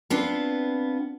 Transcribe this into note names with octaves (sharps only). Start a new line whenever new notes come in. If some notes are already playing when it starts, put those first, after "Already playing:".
B3 C4 D4 F4